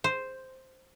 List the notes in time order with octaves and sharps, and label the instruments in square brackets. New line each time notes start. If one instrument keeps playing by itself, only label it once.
[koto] C5